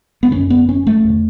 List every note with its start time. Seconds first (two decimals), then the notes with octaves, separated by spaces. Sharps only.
0.23 B3
0.31 F#2 D3 C#4
0.50 B3
0.69 C#4
0.87 A3
1.04 E2 D3